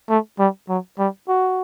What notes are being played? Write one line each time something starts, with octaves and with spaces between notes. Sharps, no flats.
A3
G3
F#3
G3
F#4